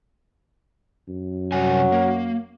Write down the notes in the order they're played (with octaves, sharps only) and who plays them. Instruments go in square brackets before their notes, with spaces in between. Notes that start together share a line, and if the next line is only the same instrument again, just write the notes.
[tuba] F#2
[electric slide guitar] C3 G3 G#5 [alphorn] F#3
[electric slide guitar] A#3